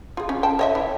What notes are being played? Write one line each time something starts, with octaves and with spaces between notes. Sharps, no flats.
F4 G#4
C#4
G5 A5
C#5 D#5 E5
E3